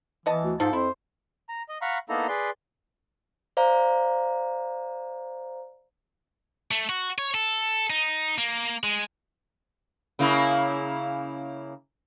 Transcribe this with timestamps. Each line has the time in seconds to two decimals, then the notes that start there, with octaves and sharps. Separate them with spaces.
0.26 E3 B3 D#5 A5
0.44 D2
0.60 G#2 F3 A4
0.73 F2 E4 C5
1.49 A#5
1.69 D#5
1.82 F5 F#5 A#5 B5 C#6
2.09 A#3 B3 D#4 E4 A4 A#5
2.28 G#4 B4 D5 C6
3.57 C5 D5 F5 A#5
6.71 A3
6.89 F#4
7.18 C#5
7.34 A4
7.90 D#4
8.38 A#3
8.83 G#3
10.19 C#3 A#3 E4